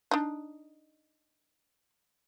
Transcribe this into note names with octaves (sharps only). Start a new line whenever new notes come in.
D4 D#4